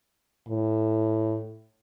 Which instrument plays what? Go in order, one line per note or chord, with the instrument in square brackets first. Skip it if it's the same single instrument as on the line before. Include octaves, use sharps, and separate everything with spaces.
[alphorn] A2